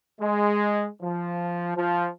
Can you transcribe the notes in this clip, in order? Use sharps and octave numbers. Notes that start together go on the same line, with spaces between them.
G#3
F3
F3